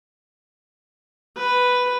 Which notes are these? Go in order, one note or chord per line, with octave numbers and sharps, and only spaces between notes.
B4